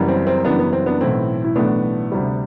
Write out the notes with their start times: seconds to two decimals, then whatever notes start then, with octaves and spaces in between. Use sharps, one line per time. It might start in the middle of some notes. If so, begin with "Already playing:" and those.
Already playing: F#1 F#2 E3 G3
0.08 C4
0.27 C4
0.45 F#1 F#2 E3 G3 B3 D4
0.59 B3
0.73 C4
0.86 B3 D4
1.01 B1 A2 E3 A3 C4 E4
1.44 E4
1.56 B1 A2 E3 A3 B3 D4
2.12 D2 C3 G3